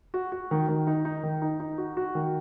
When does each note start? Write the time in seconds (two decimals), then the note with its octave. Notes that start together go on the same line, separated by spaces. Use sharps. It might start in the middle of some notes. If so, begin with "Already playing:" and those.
0.14 F#4
0.32 F#4
0.51 D#3
0.69 D#3
0.87 D#4
1.05 D#4
1.23 D#3
1.42 D#4
1.60 D#4
1.78 F#4
1.97 F#4
2.15 D#3